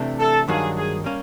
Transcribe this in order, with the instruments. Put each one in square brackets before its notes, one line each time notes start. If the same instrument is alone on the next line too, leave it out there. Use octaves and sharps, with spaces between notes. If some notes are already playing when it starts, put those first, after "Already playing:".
Already playing: [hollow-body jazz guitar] C3 E3 A3 D4
[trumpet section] A4
[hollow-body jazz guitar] G2 D#3 F#3 A#3 D4 [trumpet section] G#4
[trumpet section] G#4
[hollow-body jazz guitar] G3 A#3 C#4